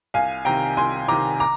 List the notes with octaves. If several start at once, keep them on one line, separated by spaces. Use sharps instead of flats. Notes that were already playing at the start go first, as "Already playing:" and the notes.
C2 F5 G#5
C3 D#3 G5 A#5
C2 G#5 C6
C3 D#3 A#5 D6
A#5 D6